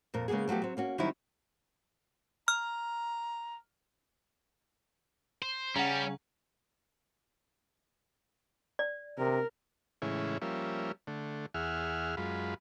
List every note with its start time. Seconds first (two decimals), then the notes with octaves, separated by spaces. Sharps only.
0.14 F2 A#2 A#4
0.28 C#3 G#3 A#3 B3 G#4
0.48 F3 F#3 A3 B3 G4
0.62 F#3 C4
0.77 A#3 C#4 F#4
0.98 D#3 F#3 G3 C4 D#4 E4
2.48 A#5 F6
5.42 C5
5.76 C#3 G3 C#4 F#5 A#5
8.79 D5
9.18 C3 A#4
10.02 A2 C#3 E3 G#3 C#4 E4
10.42 F3 G3 A#3 C#4 E5
11.07 D3 A3
11.54 E2 G#4 E5 F#5 F6
12.17 F#2 G#3 F4 B5